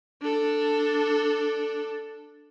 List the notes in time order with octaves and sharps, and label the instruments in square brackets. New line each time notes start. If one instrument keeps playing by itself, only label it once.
[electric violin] D4 A4